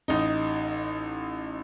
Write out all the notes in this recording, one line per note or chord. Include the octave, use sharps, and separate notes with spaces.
A1 D#4